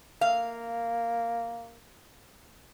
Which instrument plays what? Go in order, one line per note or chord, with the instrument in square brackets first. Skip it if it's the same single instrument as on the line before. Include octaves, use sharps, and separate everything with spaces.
[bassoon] A#3 [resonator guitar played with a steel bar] F5